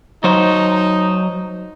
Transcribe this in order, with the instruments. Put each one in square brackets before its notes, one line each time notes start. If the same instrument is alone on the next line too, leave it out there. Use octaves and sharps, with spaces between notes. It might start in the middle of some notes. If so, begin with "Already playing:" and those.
[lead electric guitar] F#3 C5 [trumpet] D#4